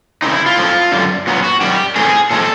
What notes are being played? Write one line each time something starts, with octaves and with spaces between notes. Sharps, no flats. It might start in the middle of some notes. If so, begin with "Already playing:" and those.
C#3 E3 C4 D#4
E4
F4
A2 F3 G#3 C4
F#2 D3 G3
A#2 F#3 B3
F#4
F#2 D#3 G3 G4
A2 E3 A3 C4 G#4
A#2 F3 G#3 C4 A4